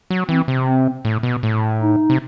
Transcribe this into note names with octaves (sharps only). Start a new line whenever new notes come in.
F#3
E3 C4
C3
C4
A2
B2
A2
D#4
C3